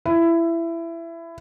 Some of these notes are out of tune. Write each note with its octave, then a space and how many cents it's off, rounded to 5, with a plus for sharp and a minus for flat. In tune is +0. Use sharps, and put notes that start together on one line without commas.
E4 +20